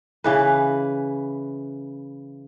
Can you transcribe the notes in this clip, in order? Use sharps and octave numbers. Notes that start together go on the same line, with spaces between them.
C#3 E3 B4